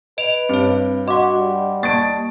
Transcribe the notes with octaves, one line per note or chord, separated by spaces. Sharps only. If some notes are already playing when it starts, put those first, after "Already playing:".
B4 D#5 D7 F7
G2 C4 C#5
F#4 D#5 F#5 C6 D6
G3
A#3 A5 C#6 A6 D7